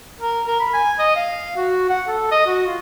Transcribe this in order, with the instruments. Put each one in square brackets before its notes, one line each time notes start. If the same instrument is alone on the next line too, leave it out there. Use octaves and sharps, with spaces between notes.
[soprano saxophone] A#4
A#4
B5
G#5
D#5
F5
F#4
F#5
A4
D#5
F#4
F4